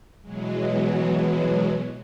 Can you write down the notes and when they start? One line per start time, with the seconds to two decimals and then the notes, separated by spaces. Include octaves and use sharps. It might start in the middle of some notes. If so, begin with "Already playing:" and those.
0.22 B2 E3 F#3 G#3